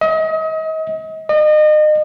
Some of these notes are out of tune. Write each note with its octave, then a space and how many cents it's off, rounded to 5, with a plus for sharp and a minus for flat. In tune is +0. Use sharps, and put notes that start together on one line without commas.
D#5 +35
D#5 -35